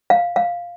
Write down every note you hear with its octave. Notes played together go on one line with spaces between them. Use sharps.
F5
F5